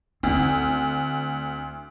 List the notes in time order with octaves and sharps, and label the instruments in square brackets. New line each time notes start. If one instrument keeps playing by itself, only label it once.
[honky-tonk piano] D2 [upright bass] C4 E4